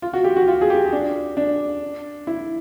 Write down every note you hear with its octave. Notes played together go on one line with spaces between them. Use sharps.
F4
F#4
G4
F#4
F4
G#4
G4
D4
D4
E4